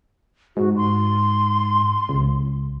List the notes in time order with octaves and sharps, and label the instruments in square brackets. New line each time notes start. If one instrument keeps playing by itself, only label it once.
[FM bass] G#2 [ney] F#4
[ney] C6
[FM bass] C#2